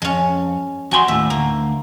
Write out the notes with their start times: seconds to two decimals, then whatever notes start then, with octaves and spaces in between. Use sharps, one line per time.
0.02 F2 G#3 C#4
0.91 F2 F#4 G5 G#5 C6
1.08 D#2 A2 E5
1.30 D2 A#3